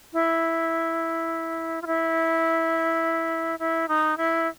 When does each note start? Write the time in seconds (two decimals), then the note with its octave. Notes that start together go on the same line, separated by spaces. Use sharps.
0.13 E4
1.82 F4
1.87 E4
3.59 E4
3.88 D#4
4.17 E4